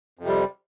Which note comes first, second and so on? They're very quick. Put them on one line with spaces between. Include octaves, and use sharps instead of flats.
F2 C3 G3